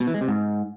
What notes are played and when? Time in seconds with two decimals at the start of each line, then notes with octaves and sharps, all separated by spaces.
0.01 B2
0.07 E3
0.14 G#3
0.21 C3
0.28 G#2